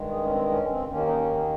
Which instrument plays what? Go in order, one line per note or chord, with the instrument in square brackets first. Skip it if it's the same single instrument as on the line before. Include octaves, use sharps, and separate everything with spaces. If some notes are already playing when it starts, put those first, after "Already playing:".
Already playing: [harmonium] G2 D#3 G#3
G#4
C#4
C4
C#4
C4
D#2 D#3 A#3 C#4
D#4
C#4